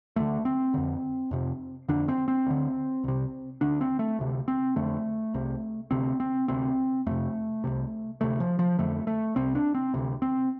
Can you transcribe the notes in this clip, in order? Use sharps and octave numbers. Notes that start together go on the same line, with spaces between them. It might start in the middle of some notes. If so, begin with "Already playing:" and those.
D2 D3 A3
C4
F2 D3
F2 C3
F2 D3 D4
C4
C4
D2 D3
C2 C3
D2 D3 D4
C4
A3
D2 C3
C4
F2 D3 A3
C2 C3
D2 C3 C4
C4
D2 C3 C4
F2 C3 A3
C2 C3
D2 C3 A3
F3
F3
F2 D3 A3
A3
C2 C3 C4
D4
C4
D2 C3
C4